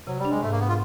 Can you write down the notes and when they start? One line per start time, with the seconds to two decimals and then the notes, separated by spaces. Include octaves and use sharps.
0.07 C3 F#3
0.19 G3
0.25 D4
0.30 G#3
0.43 G#2 A3
0.52 A#3
0.60 B3
0.69 F4